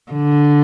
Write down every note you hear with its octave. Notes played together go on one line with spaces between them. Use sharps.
D3